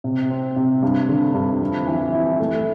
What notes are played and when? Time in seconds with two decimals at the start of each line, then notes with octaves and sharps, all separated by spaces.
0.04 C3
0.30 C4
0.56 C3
0.83 G2
1.09 D3
1.34 G2
1.61 F2
1.87 E3
2.12 E4
2.40 A3